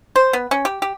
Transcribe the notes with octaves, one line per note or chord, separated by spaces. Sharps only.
C5
B3
C#4
G4
G4